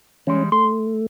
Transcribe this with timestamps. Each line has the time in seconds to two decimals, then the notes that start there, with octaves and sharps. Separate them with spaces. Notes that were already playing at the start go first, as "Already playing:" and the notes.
0.27 E3 G3 G#3 C#4
0.52 A3 C6